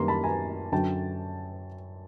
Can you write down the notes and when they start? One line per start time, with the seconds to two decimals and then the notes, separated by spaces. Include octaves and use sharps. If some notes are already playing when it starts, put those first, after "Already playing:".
Already playing: F#2 D#3 G3 A#3 A#5 C6
0.08 A5 B5
0.24 G#5 A#5
0.72 F#2 D3 F#3 G5 A5